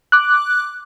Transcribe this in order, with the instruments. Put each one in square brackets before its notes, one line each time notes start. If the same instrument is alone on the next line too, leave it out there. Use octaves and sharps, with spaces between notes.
[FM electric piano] D6 F#6